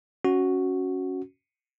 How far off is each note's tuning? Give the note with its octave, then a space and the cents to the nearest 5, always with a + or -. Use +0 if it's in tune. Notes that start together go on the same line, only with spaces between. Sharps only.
C#4 +0 F#4 +0